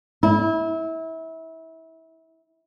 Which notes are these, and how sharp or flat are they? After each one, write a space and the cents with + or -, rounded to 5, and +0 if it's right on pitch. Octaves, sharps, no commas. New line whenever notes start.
E4 -25